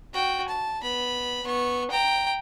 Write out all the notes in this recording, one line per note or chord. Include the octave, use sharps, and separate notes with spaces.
F#4 G5
A5
B3 B5
B3 C#6
G5 A#5